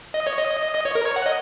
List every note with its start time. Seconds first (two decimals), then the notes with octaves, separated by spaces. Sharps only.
0.14 D#5
0.27 C#5
0.39 D#5
0.75 D#5
0.85 C#5
0.95 A#4
1.05 C#5
1.16 F#5
1.26 D#5